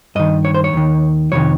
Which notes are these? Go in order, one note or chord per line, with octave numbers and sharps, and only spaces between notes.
G2 D#3 D#5
C#5
C5
C#5
D#2 D#3
F2 C3 D#3 C#5